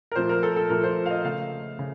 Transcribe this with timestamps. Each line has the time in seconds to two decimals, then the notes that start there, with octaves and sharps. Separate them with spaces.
0.12 A#4
0.16 A#2 F3 A3 C5
0.29 A#4
0.43 A4
0.56 A4
0.70 A#2 F3 A3 A#4
0.84 C5
1.06 F5
1.10 D#5
1.24 C#3 A3 F5
1.79 C#3